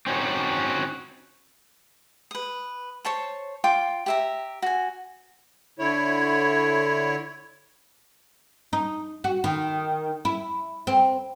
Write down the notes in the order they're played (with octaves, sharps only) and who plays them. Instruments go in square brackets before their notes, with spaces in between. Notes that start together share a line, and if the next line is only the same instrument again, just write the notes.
[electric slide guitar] C4 C#4 D#4 F#4
[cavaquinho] B4 D#6
C5 C#5 A5 C#6
F4 G5 C6 D6
G4 E5 A#5
F#4 G#5
[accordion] D3 E4 C#5
[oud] D#4
F#4
D#3
E4
C4